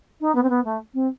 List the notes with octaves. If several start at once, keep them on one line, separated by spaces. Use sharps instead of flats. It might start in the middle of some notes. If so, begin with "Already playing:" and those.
D#4
B3
C4
B3
A3
C4